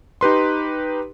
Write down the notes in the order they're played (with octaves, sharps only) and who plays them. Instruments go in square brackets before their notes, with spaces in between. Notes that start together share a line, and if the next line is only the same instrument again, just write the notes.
[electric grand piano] D#4 G4 B4 C6